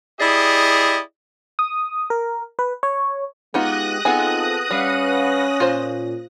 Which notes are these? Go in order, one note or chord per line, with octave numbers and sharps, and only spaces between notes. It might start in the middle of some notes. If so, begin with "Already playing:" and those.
E4 G4 G#4 D5 D#5
D#6
A#4
B4
C#5
G#3 B3 D#4 F4 G4 D#6 F#6 A#6
B3 C4 D#4 F4 G#4 A4 G#5
G3 C#4 B4 F5 F#5
A#2 F4 C5